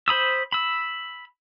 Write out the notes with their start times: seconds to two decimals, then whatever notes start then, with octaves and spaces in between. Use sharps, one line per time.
0.08 C5 B5 D#6 E6
0.52 B5 E6